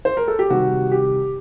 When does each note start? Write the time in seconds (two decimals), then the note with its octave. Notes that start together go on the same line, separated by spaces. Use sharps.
0.05 C5
0.17 A#4
0.28 A4
0.39 G4
0.50 C3 D#3 G3 F#4
0.91 G4